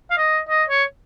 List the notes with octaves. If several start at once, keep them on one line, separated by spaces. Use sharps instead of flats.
F5
D#5
D#5
C#5